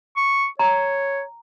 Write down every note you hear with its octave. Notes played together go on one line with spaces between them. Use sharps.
C#6
C#5 A#5